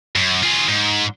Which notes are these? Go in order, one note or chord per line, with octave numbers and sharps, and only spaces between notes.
F#2
F4 G#4
G#2